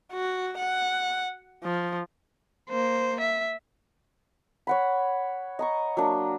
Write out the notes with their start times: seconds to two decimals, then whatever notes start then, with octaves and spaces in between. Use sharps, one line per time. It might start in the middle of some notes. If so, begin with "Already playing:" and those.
0.13 F#4
0.57 F#5
1.63 F3
2.70 A#3 C5
3.21 E5
4.67 C#5 F#5 B5
5.59 D#5 A#5 C#6
5.97 F#3 A#3 D4